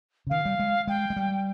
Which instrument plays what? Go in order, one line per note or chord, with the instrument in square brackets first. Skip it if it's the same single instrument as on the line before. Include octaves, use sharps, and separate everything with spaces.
[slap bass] C#3
[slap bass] D#3 [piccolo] F5
[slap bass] G3
G#3
[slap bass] G#3 [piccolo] G5
[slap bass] G#3
G3